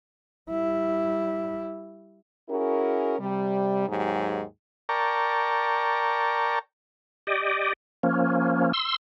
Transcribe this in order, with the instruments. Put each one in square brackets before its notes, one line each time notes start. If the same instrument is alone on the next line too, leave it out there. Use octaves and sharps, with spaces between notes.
[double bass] G3 E4
[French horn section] C#4 E4 F#4 G#4 A#4
C3 G3
D#2 G#2 F#3 D#4 G4 G#4
[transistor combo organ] A#4 D5 G5 A5 A#5 C#6
[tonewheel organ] G4 D5 D#5
F3 A#3 C#4
C6 E6